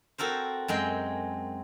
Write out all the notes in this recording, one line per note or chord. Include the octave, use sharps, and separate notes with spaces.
C4 F#4 A4 A#4 C5
F#2 G#3 C4 G5